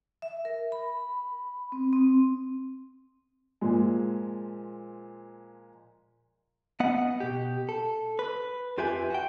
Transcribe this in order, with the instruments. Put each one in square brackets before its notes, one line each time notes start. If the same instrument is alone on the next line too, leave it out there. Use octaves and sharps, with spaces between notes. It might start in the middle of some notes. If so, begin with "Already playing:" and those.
[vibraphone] E5
A#4
B5
C4
C4
[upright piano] A#2 F3 G#3
[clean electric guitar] B3 D#5 F#5
B2 G4
A4
B4
F2 F4 G4 B4 E5 G#5
F#4 G5